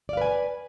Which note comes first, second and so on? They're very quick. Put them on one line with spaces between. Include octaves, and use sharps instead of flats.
D5 F5 B4 G#5